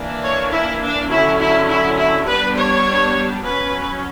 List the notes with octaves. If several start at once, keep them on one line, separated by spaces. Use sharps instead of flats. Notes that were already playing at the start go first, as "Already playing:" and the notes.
Already playing: E3 A#3 D4
C#5
E4
D4
D3 F#3 C#4 E4
E4
E4
E4
G3 B3 D4 B4
C#5
F#3 C#4 B4